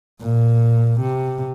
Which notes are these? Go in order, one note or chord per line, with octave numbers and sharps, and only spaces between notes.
A#2
C3